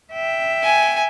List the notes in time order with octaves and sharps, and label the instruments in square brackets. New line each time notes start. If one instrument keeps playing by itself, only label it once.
[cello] E5 G5
[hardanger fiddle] G#5